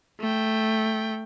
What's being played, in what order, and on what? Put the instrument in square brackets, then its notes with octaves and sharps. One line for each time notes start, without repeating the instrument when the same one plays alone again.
[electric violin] A3 G5